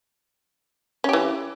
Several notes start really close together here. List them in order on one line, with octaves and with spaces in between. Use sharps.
C#4 G4 E3